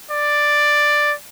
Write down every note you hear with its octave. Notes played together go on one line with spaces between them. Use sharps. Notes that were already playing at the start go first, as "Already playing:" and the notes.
D5